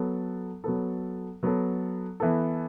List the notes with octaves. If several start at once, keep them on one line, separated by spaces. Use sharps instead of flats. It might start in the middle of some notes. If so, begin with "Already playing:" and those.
Already playing: F#3 B3 A4
F#3 B3 A4
F#3 B3 A4
E3 B3 A4